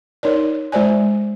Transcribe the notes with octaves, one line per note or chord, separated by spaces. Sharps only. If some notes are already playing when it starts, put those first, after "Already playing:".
D#4 A#4 C#5 D5
G#3 C5 D5 G#5